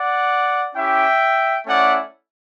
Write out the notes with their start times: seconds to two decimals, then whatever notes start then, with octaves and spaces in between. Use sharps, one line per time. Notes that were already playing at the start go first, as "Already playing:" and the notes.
Already playing: D5 F#5
0.74 C#4 E4 G4 E5 G5
1.67 A3 C#4 E4 D5 F#5